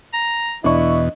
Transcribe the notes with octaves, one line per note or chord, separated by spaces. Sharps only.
A#5
E2 B2 D4 E4 D#5 C#6